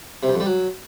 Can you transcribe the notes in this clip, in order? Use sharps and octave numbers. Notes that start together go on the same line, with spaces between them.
C3
G2
F2
G3
F#3